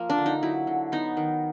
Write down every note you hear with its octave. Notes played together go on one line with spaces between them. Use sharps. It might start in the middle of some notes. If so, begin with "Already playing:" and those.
Already playing: F3 A#3
D4
D3
D#4
F#3 E4
D3
B3 D#4
D#3